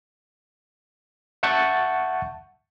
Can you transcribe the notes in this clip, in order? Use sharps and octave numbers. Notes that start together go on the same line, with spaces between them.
E5 F#5 A5 C#6 G6 A6